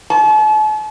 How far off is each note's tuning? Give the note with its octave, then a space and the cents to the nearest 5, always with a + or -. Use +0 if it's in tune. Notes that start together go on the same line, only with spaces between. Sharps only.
A5 -45